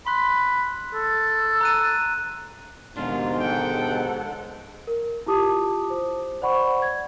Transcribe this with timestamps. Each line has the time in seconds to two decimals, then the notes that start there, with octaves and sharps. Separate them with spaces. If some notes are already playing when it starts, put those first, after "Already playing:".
0.07 B5 C6 F#6
0.94 A4
1.61 A#5 F#6 D#7
2.97 D#2 G#2 B2 D3 D4 F4
3.39 A4 F#5 G5
4.87 A#4
5.26 E4 F4 G4 A5 D6 D#6
5.90 C5
6.42 C5 D5 F#5 B5 C#6
6.82 G#6